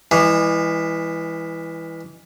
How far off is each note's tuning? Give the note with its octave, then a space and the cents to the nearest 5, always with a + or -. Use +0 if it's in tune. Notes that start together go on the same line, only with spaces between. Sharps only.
E3 +0 G#3 -40